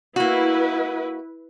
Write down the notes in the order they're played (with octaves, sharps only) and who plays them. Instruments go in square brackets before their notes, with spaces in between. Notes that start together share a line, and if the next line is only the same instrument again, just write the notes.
[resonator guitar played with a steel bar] A#3 F#4 [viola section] E4 B4